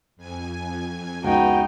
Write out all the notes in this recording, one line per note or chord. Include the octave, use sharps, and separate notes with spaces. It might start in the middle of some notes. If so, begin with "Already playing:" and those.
F2 G#5
C#2 B3 D#4 F#4 G5